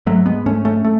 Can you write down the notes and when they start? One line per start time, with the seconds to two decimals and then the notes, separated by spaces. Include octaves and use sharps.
0.06 G#2 F#3 A3
0.26 G#3 B3
0.46 G#2 A3 C#4
0.65 A3 C#4
0.84 A3